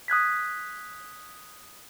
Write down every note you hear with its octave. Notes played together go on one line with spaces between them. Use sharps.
D#6 F#6 G#6 B6